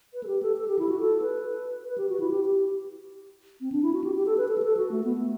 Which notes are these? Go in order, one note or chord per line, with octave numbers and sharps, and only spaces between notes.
B4
A4
G4
A4
A4
G4
E4
F#4
A4
B4
B4
G4
F#4
E4
G4
G4
C4
D4
E4
F#4
G4
G4
A4
B4
A4
G4
A4
F#4
A3
B3
A3